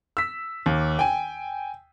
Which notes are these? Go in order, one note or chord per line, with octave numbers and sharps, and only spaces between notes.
E6 B6
D#2
G5 G#5